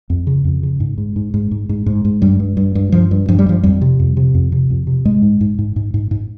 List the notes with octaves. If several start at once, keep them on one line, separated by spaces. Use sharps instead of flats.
F2
C#3
F2
C#3
G#2
G#2
G#2
G#2
G#2
G#2
G#2
G#2
G2 G3
G2
G2
G2
G2 F3
G2
G2 F3
G3
G2 F3
F2 G3
C3
F2
C3
F2
C3
F2
C3
G#2 G#3
G#2
G#2
G#2
G#2
G#2
G#2